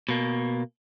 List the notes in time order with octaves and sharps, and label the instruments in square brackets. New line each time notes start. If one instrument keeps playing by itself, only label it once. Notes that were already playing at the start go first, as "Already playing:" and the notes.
[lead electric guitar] B2 A#3